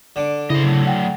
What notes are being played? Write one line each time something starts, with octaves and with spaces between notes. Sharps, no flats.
D3 D6
C#3 E4 C5 D#5
F#3 A3
F#5 G5